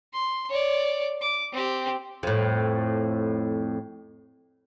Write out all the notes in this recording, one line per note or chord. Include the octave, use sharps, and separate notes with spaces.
C6
C#5 D5
D6
C4 G4
F2 A2